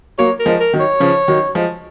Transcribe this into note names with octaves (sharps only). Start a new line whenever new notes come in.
F#3 A#3 C#5
A#4
F3 G#3
A#4
D#3 F#3
C#5
C#3 F3
D#3 F#3
F3 G#3